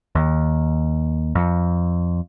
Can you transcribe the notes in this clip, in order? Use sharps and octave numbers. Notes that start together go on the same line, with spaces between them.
D#2
F2